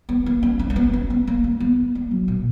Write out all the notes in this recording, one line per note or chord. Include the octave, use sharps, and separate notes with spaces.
B3
A#3
C#4
C#4
A#3
B3
C#4
B3
A#3
A#3
B3
A#3
F#3
A#2